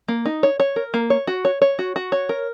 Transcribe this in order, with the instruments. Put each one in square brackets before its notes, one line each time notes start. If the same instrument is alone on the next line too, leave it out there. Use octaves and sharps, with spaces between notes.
[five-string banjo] A#3
D#4
C#5
C#5
A#4
A#3
C#5
F#4
C#5
C#5
F#4
F#4
C#5
A#4